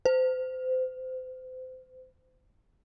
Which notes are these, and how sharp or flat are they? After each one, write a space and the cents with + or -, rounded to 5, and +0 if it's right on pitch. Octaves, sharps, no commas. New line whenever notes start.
C5 -30